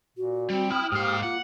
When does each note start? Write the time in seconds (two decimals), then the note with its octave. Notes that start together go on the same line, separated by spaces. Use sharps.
0.17 A#2 F#4
0.50 G3 C4
0.70 E4 G5 B5 D#6 F6
0.92 G#2 A#3 G4 C5
1.23 F4 F#5